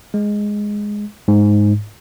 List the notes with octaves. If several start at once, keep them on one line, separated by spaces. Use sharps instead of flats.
G#3
G#2